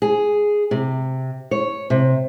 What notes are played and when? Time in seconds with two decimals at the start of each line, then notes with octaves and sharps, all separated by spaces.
0.02 G#4
0.71 C3
1.51 C#5
1.90 C3